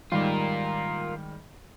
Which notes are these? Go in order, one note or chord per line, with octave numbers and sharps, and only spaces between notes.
G#2 D#3 G3 F4 A#4